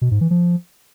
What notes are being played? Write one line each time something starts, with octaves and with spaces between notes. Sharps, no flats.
B2
G#2
E3
F3